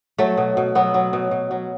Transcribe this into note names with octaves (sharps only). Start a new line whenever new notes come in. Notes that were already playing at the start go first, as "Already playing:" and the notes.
F#3 A3
B2
B2
F#3 B3
F#3
B2
B2
F#3